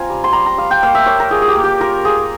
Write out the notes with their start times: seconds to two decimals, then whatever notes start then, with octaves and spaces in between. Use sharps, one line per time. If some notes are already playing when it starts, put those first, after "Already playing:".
Already playing: C4 F4 G#5 A#5
0.09 G3
0.24 C6
0.33 G3 A#5
0.46 A#5
0.57 G3 F5
0.71 G5
0.83 A#3 F5
0.95 E5
1.06 A#3 C#5
1.20 A#4
1.31 F4 G#4
1.42 G#4
1.48 G4
1.56 A#3
1.64 G4
1.80 F4 A#4
2.05 F4 G#4